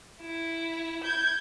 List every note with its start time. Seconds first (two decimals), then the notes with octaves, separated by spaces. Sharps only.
0.22 E4
1.04 G6 G#6